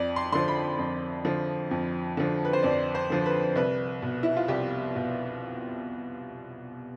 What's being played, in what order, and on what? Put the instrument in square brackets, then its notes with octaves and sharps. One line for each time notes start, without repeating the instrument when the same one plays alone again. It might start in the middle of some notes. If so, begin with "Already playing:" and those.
Already playing: [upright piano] F2 D5
C6
D3 F3 C6
B5
F2
D3 F3
F2
D3 F3
B4
C5
F2 D5
C5
D3 F3
B4
C2 B4
B2
E4
F4
C2 G4
B2